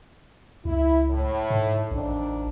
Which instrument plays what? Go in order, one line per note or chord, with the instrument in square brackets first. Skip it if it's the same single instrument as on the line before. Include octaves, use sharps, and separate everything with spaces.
[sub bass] C#2 [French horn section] E4
[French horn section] A2
[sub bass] G#2
[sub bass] A1 [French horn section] F2 D#3 D4